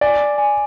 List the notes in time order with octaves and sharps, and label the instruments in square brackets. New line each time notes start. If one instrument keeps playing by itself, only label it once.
[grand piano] D5 [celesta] G#5
[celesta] G#5